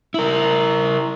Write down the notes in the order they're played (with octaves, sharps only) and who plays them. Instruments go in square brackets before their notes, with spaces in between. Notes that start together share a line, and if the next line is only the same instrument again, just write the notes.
[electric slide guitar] E4 A#4